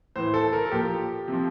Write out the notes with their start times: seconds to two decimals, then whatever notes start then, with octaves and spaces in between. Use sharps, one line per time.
0.16 A2 E3 C5
0.34 A4
0.53 A#4
0.66 A4
0.71 A#2 F3 G4
1.28 C3 F3